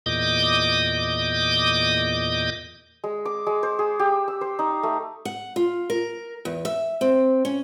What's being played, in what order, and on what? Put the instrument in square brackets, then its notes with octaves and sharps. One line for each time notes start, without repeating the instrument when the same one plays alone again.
[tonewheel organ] E2 A#2 D#5 D6 D#6 G6
[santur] G#3
D6
G#3
C5
G#4
G4
E6
C5
D#4
A3
[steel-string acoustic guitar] F#5
F4
A#4
E2
E5
C4
C#4